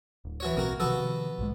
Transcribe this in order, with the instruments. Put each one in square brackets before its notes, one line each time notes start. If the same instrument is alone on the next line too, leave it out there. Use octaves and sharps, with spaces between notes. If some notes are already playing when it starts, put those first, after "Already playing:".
[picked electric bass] D1
[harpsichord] E3 F#4 C#5
[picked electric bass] D1 B1 C4 [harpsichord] A#3 F#4
[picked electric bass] C3 D#3 F3 [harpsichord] B3 F#4 A4
[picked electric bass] B1 G#2 G#3